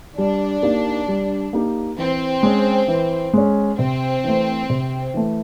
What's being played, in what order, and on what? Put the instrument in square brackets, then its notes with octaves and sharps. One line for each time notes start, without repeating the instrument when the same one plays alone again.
[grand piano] G3 [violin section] D4
[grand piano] A#3 D#4 G4 A#4
G3
A#3 D#4 G4 A#4
[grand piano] E3 [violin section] C4
[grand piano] G#3 C#4
E3
G#3 C#4
[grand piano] C3 [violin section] C4
[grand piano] E3 A3
C3
E3 A3